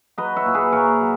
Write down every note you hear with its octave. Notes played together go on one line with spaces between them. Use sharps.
F#3 B4 D#5
C#5 E5
A#2
G#4 B4
A#2 A#4 C#5
F#3